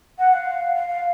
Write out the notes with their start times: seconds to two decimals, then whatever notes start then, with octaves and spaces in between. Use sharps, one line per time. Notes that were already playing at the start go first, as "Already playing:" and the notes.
0.18 F#5
0.33 F5
0.75 F5
0.88 F5